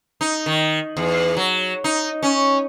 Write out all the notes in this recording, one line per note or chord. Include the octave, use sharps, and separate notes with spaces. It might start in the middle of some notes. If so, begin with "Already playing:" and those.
D#4
D#3
E2
F#3
D#4
C#4